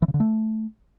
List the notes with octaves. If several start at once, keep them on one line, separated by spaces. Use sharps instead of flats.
E3
C#3
D3
A3